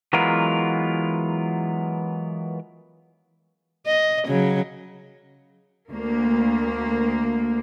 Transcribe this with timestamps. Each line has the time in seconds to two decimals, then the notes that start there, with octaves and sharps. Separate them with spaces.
0.13 E3 F#3 G#3 B3 F4 A#4
3.86 D#5
4.26 C#3 F#3
5.90 D2 A#3